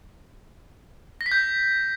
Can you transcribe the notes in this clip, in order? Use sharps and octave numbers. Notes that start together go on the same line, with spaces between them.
A#6
B6
G6